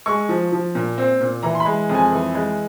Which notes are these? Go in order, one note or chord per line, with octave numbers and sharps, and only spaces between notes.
G#3 C#6
F3
F3
A#2
C4
A#2
E3 A#5
C6
B5
G#3
F2
G#5
E3
G#3